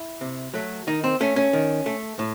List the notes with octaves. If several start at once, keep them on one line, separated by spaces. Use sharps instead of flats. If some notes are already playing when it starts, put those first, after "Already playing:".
Already playing: E4
C3
F#3 A3
D#3 D#4
C4
A3 C#4
C#4
D#3
A3
A2